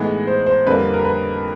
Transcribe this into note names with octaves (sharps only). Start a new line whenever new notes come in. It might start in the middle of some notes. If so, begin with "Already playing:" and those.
Already playing: A2 E3 G#3 B3 D#4
C5
C5
F2 D3 G3 A#3 D4 B4
A#4
B4